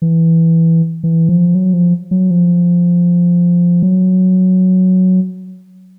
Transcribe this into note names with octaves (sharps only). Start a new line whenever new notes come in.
E3
E3
F3
F#3
F3
F#3
F3
F#3